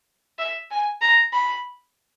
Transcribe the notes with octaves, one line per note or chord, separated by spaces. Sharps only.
E5
G#5
A#5
B5